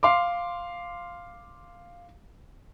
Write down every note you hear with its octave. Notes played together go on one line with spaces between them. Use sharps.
F5 C6 D6